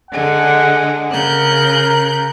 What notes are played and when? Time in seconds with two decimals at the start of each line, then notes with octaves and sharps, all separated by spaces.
0.10 D3 G#3 F#5
1.11 C#3 A#4 F#6 G6